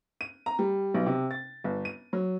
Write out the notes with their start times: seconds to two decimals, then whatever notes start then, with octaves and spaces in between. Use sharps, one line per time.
0.21 D#7
0.46 A#5
0.59 G3
0.94 B1
1.06 C3
1.31 A6
1.64 G1
1.85 D#7
2.13 F#3